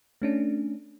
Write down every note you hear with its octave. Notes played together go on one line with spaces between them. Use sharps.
A3 C#4 D4